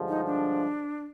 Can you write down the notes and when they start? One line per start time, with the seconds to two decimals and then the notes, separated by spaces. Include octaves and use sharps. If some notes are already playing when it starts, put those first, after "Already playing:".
Already playing: G2 D3 F3 G#3
0.09 D#4
0.26 D4